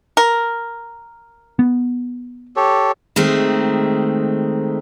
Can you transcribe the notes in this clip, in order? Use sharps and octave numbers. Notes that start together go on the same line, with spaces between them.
A#4
B3
G4 A4 C#5
D#3 G#3 A3 C4